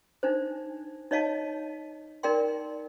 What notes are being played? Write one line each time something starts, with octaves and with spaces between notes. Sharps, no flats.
D4 D#4 C5
D#4 C#5 D#5 F5 A5
D#4 A#4 D5 G5 C6